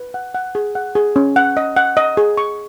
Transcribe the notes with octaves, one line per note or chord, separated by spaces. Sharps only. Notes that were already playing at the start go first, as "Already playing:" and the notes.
Already playing: B4
F#5
F#5
G#4
F#5
G#4
C#4
F#5
D#5
F#5
D#5
G#4
C#6